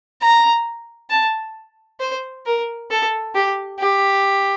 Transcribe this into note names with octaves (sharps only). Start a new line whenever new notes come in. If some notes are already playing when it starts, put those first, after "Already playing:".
A#5
A5
C5
A#4
A4
G4
G4